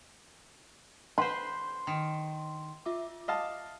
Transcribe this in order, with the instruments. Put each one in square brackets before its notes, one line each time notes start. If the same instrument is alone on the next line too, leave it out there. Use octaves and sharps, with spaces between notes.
[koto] B4 C5 [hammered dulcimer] C6
[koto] D#3
[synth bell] F4 E5 D6
[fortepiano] D#5 F5 A5